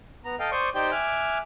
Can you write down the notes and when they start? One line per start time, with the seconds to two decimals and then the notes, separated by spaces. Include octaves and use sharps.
0.25 B3 A#5
0.39 A4 D#5 F5 G5
0.52 C5 D5 C6 C#6 D#6
0.75 D#4 G4 C5 D5 G5 G6
0.91 E5 G#5 D6 F6 F#6